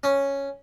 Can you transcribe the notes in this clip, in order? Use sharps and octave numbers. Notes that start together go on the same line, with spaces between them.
C#4